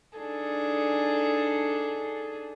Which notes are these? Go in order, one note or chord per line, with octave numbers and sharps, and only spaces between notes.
D4 D#4 G#4 A4